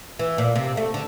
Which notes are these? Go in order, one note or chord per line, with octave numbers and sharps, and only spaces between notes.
E3
A#2
C3
A3
D3